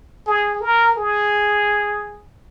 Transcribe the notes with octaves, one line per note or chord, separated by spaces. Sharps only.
G#4
A#4
G#4